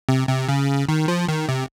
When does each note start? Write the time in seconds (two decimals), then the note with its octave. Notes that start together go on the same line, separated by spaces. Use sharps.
0.09 C3
0.29 C3
0.49 C#3
0.89 D#3
1.08 F3
1.29 D#3
1.49 C3